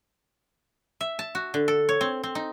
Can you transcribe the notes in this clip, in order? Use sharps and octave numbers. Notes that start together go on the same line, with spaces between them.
E5
A5
F#4
D3
A4
C#5
C4
C4
D#4